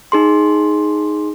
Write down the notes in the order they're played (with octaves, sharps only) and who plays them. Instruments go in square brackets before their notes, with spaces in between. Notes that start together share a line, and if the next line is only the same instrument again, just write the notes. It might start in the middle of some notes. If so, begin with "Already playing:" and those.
[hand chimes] D#4 G#4 C6